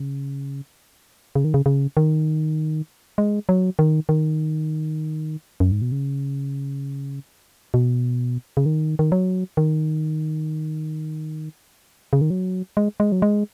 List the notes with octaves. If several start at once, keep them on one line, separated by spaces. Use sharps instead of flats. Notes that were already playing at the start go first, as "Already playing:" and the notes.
Already playing: C#3
C#3
D#3
C#3
C#3
D#3
G#3
F#3
D#3
D#3
F#2
G#2
B2
C#3
B2
C#3
D#3
D#3
F#3
D#3
C#3
D#3
F#3
G#3
G#3
F#3
G#3